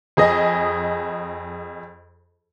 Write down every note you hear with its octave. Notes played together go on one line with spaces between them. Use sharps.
F2 G#4 D#5